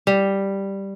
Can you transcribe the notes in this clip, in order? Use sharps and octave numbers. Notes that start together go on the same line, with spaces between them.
G3